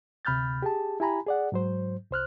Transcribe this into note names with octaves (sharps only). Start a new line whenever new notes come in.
D2 C3 B5 F6 G6 A6
G4 G#4 A5
E4 G4 G#5 A#5 B5
G#4 D5 F#5
G#2 F#3 C5
C2 C5 F6 F#6